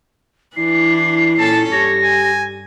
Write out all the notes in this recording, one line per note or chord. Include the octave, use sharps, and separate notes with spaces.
E3 D4 E4 C7
A#2 C#4 A4 A5
G2 G4 C#5 A#6
G#5